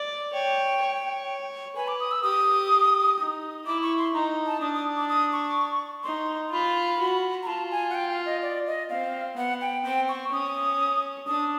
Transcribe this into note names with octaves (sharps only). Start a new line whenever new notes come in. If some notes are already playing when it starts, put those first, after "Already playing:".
Already playing: D5
C#5 G5
C#5
B4 G#5
D6
D#6
E6
G4 D#6
D#4
E4 D6
C#6
C6
D#4 A#5
A5
D4 D#6
D#6
D6
D#6
C#6
D#4 C6
F4 B5
F#4
A#5
F4 A5
G#5
F#5
G5
F5
D#5
D5
D#5
C4 F5
B3 F#5
G5
C4 G5
C#6
C#4 D#6
D4 D#6